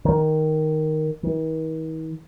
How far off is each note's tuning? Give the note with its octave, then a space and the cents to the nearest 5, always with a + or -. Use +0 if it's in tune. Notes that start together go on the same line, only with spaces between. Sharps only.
D#3 +0
D#3 +45